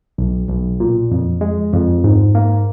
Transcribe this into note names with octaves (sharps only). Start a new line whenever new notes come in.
B1
B1
A#2
F2
G#3
F2
G#2
A#3